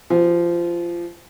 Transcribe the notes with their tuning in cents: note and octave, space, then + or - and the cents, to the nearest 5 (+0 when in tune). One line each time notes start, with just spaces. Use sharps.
F3 -20 F#4 +35